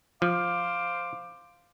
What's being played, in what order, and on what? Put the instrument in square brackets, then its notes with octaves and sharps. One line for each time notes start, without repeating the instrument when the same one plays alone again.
[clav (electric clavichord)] F3 [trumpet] C5 [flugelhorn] F5 [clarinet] D6